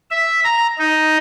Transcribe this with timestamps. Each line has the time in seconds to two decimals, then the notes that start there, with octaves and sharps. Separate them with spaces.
0.11 E5
0.44 A#5
0.78 D#4